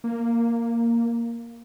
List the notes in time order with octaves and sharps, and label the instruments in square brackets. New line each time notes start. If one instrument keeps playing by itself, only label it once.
[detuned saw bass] A#3